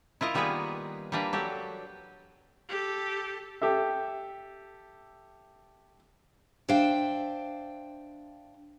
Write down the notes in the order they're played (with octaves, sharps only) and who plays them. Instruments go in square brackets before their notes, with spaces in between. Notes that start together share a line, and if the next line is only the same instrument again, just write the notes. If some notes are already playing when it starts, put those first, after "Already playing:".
[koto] E4 F4 A#4 D#5
D#3 G3 A#3 B3 G#4 B4
G3 A#3 D4 A#4 B4
F#3 G4 A4
[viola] G4 A4
[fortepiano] G4 A4 E5
[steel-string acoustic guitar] D4 C5 E5 F5 G5